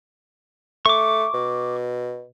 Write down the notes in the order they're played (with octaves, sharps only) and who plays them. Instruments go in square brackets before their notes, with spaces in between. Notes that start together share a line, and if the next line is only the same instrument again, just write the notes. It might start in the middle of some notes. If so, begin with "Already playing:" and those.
[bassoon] A3 [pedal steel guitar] C#6 D6
[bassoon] B2